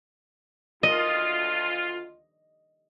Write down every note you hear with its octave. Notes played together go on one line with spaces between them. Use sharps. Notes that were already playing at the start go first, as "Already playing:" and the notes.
D2 F4 D#5